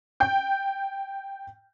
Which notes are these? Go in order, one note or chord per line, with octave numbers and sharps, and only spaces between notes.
G5 G6